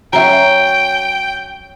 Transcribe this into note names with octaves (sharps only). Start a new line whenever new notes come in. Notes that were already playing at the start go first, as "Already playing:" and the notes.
F#3 C#4 E5 G5 A#5